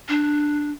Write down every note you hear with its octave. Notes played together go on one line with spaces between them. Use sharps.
D4